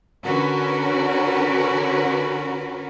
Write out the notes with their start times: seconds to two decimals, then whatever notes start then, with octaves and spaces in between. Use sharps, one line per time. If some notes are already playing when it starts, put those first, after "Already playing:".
0.25 D3 C#4 D4 F#4 A#4 B4